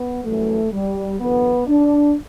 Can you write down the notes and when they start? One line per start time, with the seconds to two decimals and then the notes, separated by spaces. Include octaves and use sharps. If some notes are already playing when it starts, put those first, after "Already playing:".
Already playing: B3
0.24 F#2 E3 G3 A3
0.72 G3
1.20 E2 D3 F#3 B3
1.67 D4